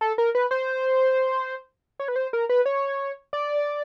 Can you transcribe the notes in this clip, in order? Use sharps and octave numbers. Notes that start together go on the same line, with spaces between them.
A4
A#4
B4
C5
C#5
B4
C5
A#4
B4
C#5
D5